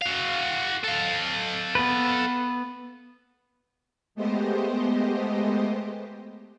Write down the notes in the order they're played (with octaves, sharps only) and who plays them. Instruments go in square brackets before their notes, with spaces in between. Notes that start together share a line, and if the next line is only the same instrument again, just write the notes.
[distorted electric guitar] F#4 F5
A4 F5
[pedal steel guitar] B3 B4
[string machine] G#3 A3 B3 G4 C5 D#5